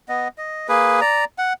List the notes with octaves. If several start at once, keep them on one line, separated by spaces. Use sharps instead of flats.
B3 D#5
D#5
A#3 G#4 B4
D5 A#5
F#5